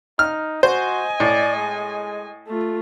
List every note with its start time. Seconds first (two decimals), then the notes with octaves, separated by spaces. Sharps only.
0.19 D#4 F6
0.63 F#4 C5 D#5 G#5
1.20 A2 D5
1.56 G#3
2.48 A3 F4